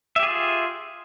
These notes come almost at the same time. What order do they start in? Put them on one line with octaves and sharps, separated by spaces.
E5 G4 G#4 F4